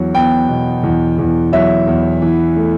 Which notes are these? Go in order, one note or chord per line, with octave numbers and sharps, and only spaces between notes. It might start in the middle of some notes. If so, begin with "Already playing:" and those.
Already playing: E2 F#3
B3 G5
B2
E2
E2
F#3 E5
E2
E3
A3